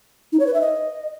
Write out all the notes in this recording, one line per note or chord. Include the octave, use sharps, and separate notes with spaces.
D#4
C#5
B4
E5
D#5